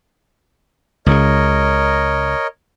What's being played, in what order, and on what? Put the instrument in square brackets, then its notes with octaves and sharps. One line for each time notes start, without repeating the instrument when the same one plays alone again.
[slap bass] C#2 C#3 [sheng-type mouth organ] A#4 C#5 D#5